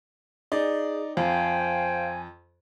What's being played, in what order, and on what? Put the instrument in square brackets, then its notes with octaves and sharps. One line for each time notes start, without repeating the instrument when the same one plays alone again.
[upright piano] D#4 D5 [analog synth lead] G#4
[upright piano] F2 [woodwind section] C5 G5 G#5 [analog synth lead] F5